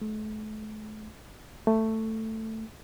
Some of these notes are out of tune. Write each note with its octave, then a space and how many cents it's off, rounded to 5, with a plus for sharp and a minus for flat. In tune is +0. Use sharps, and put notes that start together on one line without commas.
A3 -40
A3 +10